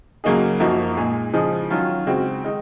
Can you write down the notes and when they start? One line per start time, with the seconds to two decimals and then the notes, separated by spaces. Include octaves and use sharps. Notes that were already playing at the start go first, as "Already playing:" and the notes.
0.24 C#3 F#3 A#3 D#4 G#4
0.60 F#2 F3 A#3 D#4 F#4
0.97 A#2 G#3 D#4 G#4
1.34 C#3 F3 G#3 D#4 G#4
1.70 D#3 F#3 C#4 F4
2.07 C#3 G#3 C4 F#4
2.44 D#3 G#3 D#4